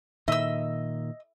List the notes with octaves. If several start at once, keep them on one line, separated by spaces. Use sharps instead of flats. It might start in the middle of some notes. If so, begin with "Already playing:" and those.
A#2 D#3 D#5 E5 E6